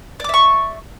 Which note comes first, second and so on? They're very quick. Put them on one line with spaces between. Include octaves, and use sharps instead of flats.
D5 D6 E5 C#6